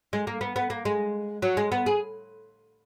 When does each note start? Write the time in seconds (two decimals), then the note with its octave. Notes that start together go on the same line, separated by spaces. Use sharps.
0.13 G#3
0.27 A#3
0.41 B3
0.56 B3
0.70 A#3
0.85 G#3
1.42 F#3
1.57 G#3
1.72 B3
1.86 G#4